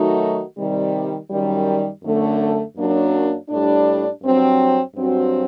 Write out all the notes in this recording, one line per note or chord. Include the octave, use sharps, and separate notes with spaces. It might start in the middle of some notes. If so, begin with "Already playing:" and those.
Already playing: D#3 F#3 A3 D#4 F#4
C3 D#3 G3
F#2 D#3 G3
F#2 D3 A3
F#2 F#3 A#3 D4
A2 G3 D4
G2 F#3 C4
G2 F#3 C4 F#4